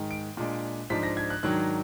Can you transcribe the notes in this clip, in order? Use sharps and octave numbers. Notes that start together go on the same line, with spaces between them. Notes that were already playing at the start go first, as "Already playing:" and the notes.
Already playing: G#2 D#3 G#3
D7
A#2 G#3 D4
G#2 F3 G#3 D4 B6
A#6
G#6
F#6
G#2 D#3 F#3 D4 F#6